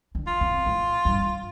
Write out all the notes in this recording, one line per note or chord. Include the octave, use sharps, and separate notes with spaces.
D3
F4
C3
A2
G2